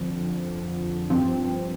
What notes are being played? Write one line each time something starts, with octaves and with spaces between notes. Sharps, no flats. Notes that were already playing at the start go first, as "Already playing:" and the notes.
Already playing: F2 D3 F3
G2 F3 C4